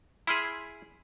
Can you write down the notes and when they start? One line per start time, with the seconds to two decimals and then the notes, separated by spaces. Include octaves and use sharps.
0.27 E4 G#4 B5 C6 F6